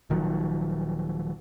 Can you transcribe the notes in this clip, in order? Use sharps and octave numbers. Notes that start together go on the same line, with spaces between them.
D#1 D#3 F3 F#3